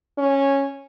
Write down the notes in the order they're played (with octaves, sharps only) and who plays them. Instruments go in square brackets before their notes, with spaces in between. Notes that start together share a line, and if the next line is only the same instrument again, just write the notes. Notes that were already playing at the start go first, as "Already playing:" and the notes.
[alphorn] C#4